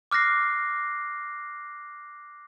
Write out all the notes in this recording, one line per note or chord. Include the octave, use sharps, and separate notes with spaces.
D6 F6 F#6 A#6 C7